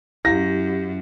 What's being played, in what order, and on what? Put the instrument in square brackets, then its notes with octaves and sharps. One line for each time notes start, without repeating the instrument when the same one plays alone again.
[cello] F#2 [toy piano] E4 F5 [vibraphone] G4 [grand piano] A#6